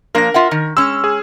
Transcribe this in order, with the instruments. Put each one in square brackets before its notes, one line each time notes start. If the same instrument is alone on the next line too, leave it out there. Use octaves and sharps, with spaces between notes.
[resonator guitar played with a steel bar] F3 A#3 D4 [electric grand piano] A#4 A#6
[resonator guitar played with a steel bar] F4 E5 F#5
D#3
[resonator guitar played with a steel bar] G#3 C#4 [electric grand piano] E6
[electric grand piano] G#4